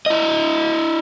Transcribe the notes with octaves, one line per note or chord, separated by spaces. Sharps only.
E4 D#5